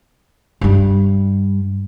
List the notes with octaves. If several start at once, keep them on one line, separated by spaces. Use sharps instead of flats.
G2 G3